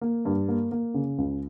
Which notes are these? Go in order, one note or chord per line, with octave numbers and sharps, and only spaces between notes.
A#3
G2
A#3
A#3
C#3
C#2